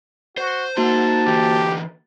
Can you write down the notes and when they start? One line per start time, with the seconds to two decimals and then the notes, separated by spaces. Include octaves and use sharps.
0.38 F#4 C5
0.77 A#3 D#4 F#4 C5 A5 C6
1.26 D3 E3 G4